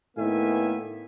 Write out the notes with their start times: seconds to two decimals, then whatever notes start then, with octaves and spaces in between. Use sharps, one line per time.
0.17 A2 D#3 A#3 B3 E5 G#5